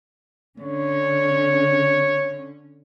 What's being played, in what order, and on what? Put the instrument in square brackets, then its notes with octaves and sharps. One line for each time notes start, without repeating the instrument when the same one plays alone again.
[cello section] D3 C#4 [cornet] C#5